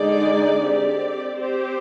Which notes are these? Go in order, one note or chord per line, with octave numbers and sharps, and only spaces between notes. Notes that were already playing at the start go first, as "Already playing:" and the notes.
Already playing: D3 G#3 D#4 G#4 D5
C4 G4 D5
C4 G4 C5